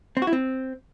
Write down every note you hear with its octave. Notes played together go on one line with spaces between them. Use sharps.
C4
F#4
E4
C4